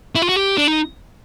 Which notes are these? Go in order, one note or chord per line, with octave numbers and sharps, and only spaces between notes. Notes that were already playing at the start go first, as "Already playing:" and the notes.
E4
F4
F#4
G4
D4
D#4